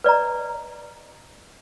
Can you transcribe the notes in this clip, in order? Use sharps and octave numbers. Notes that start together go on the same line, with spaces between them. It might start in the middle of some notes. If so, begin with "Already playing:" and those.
B4 D5 D#5 A#5